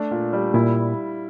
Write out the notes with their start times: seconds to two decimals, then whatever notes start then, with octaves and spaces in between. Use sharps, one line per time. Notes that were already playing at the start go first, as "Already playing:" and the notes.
Already playing: A3 D4
0.11 A#2
0.33 G3
0.54 A#2 E4